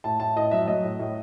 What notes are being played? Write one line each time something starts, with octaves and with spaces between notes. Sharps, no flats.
A2 A5
A2 A5
A2 D#5
F#3 E5
F#3 D#5
A2
A2